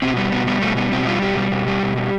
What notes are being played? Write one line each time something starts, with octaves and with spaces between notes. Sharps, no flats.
B2 C4
G3 B3
B2 B3
G3 B3
B2 A3
G3 B3
B2 C4
G3 F4
B2 G4
G3
B2
G3
B2
G3